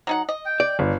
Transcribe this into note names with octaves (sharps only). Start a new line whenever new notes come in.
F#3 D#4 F#5
D#5
G5
D5
G1